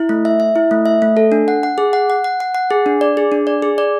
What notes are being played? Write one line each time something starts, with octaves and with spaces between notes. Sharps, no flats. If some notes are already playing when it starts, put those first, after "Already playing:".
Already playing: E4
A3
E5
E5
E4
A3
E5
A3
A4
D4
F#5
F#5
G#4
F#5
F#5
F#5
F#5
F#5
G#4
D4
D5
G#4
D4
D5
G#4
D5